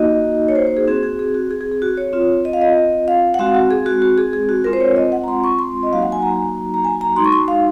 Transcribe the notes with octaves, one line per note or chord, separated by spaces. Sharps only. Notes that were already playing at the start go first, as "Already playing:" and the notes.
Already playing: A#3 D#4 F#4 D#5
C#5
C5
C5
G#4
C4 F#4 G#4
G#4
G#4
F#4
G#4
G#4
G#4
F#4
C#5
C4 F4
D#5
F5
D#5
F5
F#5
G#3 C4 F#4 F5
F#4
G#4
F#4
F#4
G#4
G#4
F#4
G#3 C4 F4 A#4
C5
C#5
D#5
F#5
A#5
C6
C#6
C6
D#5
F#3 A#3 D#4 F#4 F5
F#5
G#5
A#5
A#5
G#5
A#5
G#3 D#4 F#4 C6
C#6
C6
F5